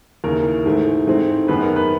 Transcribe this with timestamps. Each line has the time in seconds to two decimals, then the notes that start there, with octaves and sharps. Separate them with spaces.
0.24 D#2 C#3 E3 A#4
0.66 G#2 E3 A3
1.07 G#2 E3 A3 C4
1.48 F#2 D#3 G#3 B3 B4
1.63 A#4
1.76 B4